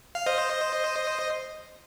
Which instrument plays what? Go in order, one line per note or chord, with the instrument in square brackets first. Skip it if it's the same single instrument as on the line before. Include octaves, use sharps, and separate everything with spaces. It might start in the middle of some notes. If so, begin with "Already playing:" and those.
[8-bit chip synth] F5
C5 D#5